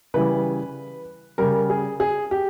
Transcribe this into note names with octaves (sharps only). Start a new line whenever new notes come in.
C#3 E3 G3 B4
C#3 G3 A#4
G#4
G#4
G4